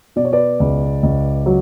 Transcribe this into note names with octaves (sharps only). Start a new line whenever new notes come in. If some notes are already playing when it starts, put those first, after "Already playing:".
B2 D5
C#5
B4 D5
C#2
C#2
F#3